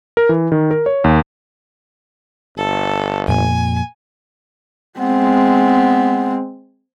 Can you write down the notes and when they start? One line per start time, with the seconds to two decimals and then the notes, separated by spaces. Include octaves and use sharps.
0.17 A#4
0.29 E3
0.52 D#3
0.71 A#4
0.86 C#5
1.04 D#2
2.58 G1 A4
3.28 F2 A#2 G#5
5.00 G#3 B3 C4